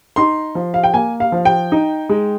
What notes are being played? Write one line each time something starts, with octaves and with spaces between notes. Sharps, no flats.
D#4 C6
F3
F5
G5
A#3 G#5
F5
F3
G5
D#4
G#3